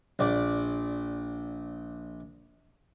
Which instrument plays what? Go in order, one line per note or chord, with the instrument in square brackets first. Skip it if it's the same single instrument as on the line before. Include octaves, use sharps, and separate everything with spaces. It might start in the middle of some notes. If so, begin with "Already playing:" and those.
[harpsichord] A#1 D5